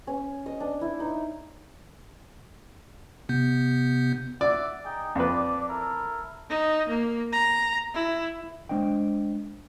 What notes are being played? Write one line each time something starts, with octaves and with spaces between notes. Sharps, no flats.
C#4
D#5
D4
E4
D#4
C3 B3 G6
D5 E5 F#5 D6
D#4 G#4 G5
F2 B4 D5
E4 A4 A#4
D#4
A#3
A#5
E4
G#3 D4 C5 D#5 G5